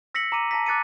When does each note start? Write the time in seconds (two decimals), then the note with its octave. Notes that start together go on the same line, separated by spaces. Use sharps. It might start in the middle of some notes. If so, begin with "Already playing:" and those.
0.15 E6 A#6 B6 C#7 F#7
0.32 A#5 D6 D#7
0.51 A5 A#5 A#6 B6
0.66 D6 F#6 A6 C#7 D#7